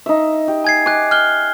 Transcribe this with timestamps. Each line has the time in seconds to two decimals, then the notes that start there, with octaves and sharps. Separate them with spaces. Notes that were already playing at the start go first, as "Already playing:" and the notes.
0.06 D#4 E5
0.48 G4
0.64 G#5 G#6 C7
0.86 G#5 D6 F#6
1.11 F6 F#6 G7